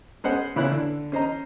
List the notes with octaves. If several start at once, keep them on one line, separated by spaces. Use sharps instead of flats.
G#3 B3 C#4 C5 D#5 F#5
A#2 C#3 B3 E4 C#5 F#6
D3
C#4 C5 D#5 A#5